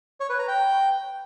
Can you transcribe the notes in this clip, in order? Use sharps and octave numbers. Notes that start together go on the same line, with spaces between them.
C#5
B4
A#5
G5